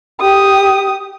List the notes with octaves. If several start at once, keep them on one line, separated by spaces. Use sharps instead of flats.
G4 D#6